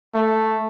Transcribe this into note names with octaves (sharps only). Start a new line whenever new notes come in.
A3